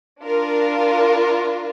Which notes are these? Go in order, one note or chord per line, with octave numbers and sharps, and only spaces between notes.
D4 F4 A#4